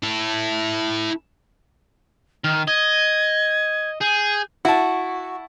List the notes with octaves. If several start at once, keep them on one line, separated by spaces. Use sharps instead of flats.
E4 A4
D#3 F6
D#5 G#6
G#4 G6
E4 F#4 A5